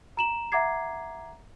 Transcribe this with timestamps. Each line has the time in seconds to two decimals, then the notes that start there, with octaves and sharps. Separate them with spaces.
0.17 A#5 E7 F#7
0.52 E5 F#5 A#5 D6 G#6 C7